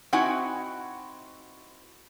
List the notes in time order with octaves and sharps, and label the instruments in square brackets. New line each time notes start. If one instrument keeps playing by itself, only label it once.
[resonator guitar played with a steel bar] C4 D#4 E4 F#4 F#5 G#5